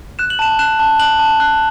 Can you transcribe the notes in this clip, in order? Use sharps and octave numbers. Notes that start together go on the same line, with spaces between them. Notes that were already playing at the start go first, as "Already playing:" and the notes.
F#6 E7
F#7
A5 E7
F#6 E7
A5
F#6 F#7
A5
F#6